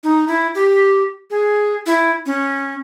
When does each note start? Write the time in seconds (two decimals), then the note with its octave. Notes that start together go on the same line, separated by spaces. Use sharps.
0.04 D#4
0.28 E4
0.55 G4
1.31 G#4
1.86 E4
2.26 C#4